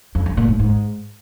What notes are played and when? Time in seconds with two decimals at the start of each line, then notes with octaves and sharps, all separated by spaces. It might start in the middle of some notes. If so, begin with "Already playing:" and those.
0.15 F2
0.26 G2
0.37 A#2
0.48 G#2
0.59 G#2